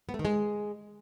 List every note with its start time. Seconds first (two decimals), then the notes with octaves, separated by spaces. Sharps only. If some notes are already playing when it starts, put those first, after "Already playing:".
0.09 B3
0.14 A3
0.19 D#3
0.25 G#3